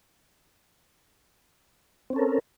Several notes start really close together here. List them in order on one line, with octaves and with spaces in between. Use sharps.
C4 C#4 A4 A#4